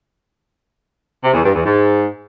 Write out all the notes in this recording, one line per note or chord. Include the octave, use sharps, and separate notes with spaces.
C3
E2
G2
E2
G#2